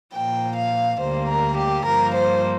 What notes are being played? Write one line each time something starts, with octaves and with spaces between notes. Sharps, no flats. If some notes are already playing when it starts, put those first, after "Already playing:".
A#2 F3 A#3 G5
F5
D2 D3 G3 A#3 C5
A#4
G4
G2 F3 A#3 A#4
C5